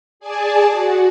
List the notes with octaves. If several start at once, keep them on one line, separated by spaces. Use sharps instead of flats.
G#4 D5 G#5 A5
F#4